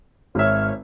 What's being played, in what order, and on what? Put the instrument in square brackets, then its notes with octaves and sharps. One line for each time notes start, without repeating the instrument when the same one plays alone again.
[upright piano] G#1 E5 [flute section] C#5 F6